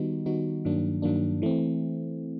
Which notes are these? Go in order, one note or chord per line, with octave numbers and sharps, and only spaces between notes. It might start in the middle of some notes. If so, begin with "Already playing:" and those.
Already playing: D#3 G3 B3 D#4 F#4
D#3 G3 B3 D#4 F#4
G2 D#3 F#3 A#3 D4
G2 D#3 F#3 A#3 D4
E3 A3 C4